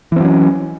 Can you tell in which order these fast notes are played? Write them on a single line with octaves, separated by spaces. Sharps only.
E3 C4 F#3 C#4